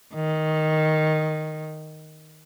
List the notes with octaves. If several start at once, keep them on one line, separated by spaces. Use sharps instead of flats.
D#3